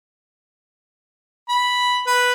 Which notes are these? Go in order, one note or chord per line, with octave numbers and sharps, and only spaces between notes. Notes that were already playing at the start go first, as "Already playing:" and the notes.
B5
B4